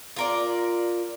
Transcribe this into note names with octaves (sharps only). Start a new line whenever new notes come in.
F4 A#4 D5